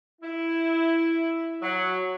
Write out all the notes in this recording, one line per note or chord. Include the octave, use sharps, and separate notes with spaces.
E4
F#3